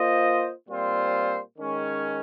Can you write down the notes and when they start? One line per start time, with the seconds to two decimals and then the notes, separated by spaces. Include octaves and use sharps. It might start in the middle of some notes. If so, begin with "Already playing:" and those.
Already playing: A#3 F4 C5 D#5
0.69 A#2 G3 C4 F4 C5
1.58 D#3 G#3 C#4